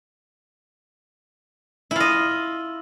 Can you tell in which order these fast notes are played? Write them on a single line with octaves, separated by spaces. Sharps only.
E4 F4 D#5